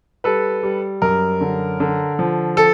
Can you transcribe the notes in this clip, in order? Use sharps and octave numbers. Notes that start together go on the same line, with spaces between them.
G3 A4 B4
G3
F#2 A#4
D3
D3
F3
A4